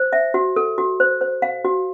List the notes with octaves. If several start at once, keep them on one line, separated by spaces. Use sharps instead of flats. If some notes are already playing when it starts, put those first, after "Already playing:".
Already playing: C5
E5
F#4
A4
F#4
C5
C5
F5
F#4